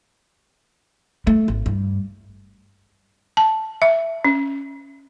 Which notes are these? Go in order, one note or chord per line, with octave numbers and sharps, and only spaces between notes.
A3
G#1
G2
A5
E5
C#4